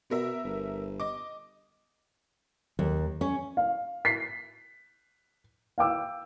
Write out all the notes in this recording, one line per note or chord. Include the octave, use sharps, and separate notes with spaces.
B2 B3 A#4 E5
G1
D#5 D6
D#2 F#3
C#4
F5
B6 C7
F5 G5 D6 E6